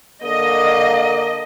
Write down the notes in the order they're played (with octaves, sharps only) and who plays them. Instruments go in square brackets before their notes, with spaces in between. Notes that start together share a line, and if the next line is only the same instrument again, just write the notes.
[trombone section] D3 A#3 [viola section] D#5